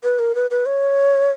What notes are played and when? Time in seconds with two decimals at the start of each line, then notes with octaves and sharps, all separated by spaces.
0.04 B4
0.19 A#4
0.35 B4
0.51 B4
0.66 C#5